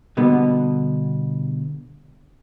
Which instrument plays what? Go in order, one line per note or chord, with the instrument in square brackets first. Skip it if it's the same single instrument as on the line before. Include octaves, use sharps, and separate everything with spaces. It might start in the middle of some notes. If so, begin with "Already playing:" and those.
[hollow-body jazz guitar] B2 D3 G3 B3